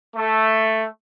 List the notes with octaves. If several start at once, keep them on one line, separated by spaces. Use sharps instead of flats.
A3